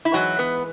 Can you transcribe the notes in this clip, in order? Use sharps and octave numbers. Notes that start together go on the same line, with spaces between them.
E4
G#2 E3 F#3 F#4
B3